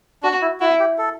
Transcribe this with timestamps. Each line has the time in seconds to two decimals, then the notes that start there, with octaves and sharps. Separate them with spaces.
0.23 D4 F#4
0.41 E4
0.60 E4 F#4
0.80 G4
0.98 A4